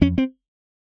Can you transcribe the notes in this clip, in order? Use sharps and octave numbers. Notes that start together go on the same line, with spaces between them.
F2 C#4
C4